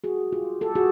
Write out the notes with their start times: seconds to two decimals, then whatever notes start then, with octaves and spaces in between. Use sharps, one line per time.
0.04 F#4 G#4
0.32 F4 G4
0.61 G4 A4
0.75 F#4 G#4